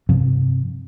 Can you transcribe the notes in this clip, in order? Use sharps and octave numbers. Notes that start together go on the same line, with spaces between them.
G2 C3 F3 C4